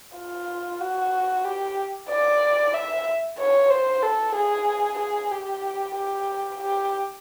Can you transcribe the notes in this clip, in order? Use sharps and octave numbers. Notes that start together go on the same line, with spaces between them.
F4
F#4
G4
D5
E5
C#5
C5
A4
G#4
G#4
G4
G4
G4